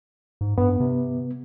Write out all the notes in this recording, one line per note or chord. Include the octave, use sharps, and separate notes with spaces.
G#2
G2 B3
C3